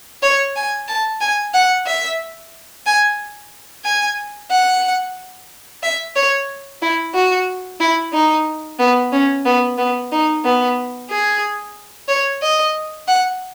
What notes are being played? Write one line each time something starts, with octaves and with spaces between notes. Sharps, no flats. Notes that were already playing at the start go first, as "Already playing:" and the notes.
C#5
G#5
A5
G#5
F#5
E5
G#5
G#5
F#5
E5
C#5
E4
F#4
E4
D#4
B3
C#4
B3
B3
D#4
B3
G#4
C#5
D#5
F#5